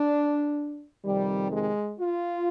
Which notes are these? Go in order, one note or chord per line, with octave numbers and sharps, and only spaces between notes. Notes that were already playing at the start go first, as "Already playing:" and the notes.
Already playing: D4
F2 C3 D#3 G3
G#3
F4